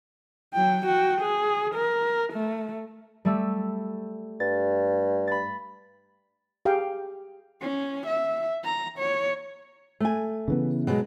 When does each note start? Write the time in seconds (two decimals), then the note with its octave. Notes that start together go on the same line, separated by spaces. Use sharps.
0.54 F#3 G5
0.86 F#4 G5
1.21 G#4
1.75 A#4
2.33 A3
3.25 G3 A3 E6
4.40 G2 A6
5.27 B5 A6
6.65 G4 G#4 F5 G5
7.61 C#4
8.06 E5
8.65 A#5
8.98 C#5
10.00 A3 G#5
10.48 C#3 E3 B3
10.87 B2 F#3 G#3